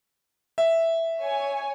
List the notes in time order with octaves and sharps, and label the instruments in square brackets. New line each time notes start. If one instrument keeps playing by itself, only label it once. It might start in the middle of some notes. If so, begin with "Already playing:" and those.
[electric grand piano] E5
[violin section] C#5 G#5